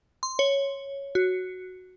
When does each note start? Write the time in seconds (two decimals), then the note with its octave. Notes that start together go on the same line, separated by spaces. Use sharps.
0.23 C6
0.39 C#5
1.15 F#4